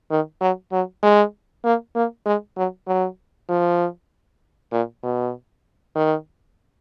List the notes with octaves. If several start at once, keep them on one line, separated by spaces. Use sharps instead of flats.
D#3
F#3
F#3
G#3
A#3
A#3
G#3
F#3
F#3
F3
A#2
B2
D#3